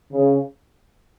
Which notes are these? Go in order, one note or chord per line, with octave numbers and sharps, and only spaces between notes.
C#3